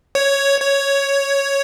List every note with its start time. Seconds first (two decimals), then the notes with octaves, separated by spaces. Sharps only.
0.15 C#5
0.60 C#5